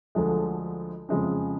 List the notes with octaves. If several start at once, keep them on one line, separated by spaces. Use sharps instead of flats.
D2 D3 F3 G#3
F2 C#3 F3 G#3 C#4